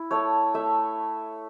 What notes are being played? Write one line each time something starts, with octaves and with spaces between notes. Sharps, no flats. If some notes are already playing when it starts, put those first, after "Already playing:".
Already playing: E4
A3 C#5
A3 E5